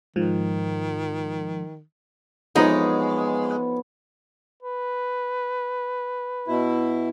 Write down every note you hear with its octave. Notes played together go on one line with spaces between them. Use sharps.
G#2 D#3 F3
F2 E3 G#3 B3 D#4 C#5
B4
B2 E4